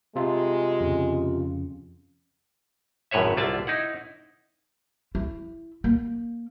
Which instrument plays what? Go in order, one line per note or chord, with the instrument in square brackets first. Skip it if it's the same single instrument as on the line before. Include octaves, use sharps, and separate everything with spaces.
[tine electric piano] C3 F4 [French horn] G#3
[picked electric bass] F2 C#3
[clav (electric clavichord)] G#1 F#2 A2 B4 C#5 E5
C2 D3 F4 D5 E5 A5
D#4 E4 F#5
[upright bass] E4
A#3